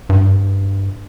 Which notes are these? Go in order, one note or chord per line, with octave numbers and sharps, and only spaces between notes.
G2